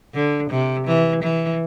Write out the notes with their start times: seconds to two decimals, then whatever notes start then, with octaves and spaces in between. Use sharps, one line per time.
0.14 D3
0.51 C3
0.87 E3
1.23 E3